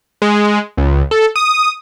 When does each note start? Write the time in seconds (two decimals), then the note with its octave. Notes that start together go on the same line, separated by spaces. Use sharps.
0.22 G#3
0.78 C#2
1.11 A4
1.36 D#6